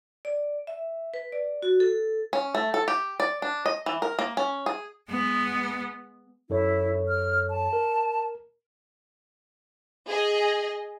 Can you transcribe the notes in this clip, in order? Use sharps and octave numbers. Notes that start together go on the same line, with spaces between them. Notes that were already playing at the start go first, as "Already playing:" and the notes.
D5
E5
B4
D5
F#4
A4
C#4
A3
A4
G4
D5
D4
D#5
E3
A#4
A#3
C#4
G#4
G#3 B3
F#2 E4 A4 C#5
F6
A5
A#4
G#4 D#5